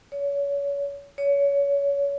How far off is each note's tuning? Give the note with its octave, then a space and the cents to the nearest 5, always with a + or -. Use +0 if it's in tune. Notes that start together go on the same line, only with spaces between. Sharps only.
C#5 +30
C#5 +25